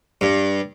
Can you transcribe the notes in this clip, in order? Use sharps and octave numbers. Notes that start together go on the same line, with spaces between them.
G2